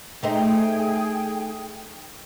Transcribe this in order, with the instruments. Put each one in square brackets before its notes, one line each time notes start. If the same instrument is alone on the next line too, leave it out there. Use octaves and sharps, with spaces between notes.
[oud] A3 D#4 C5 [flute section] G#4 G5